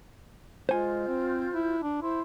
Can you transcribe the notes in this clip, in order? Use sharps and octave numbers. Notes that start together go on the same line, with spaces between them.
G#3 F4 C5 G#5 F6 G6
C4
E4
D4
E4 C5 C6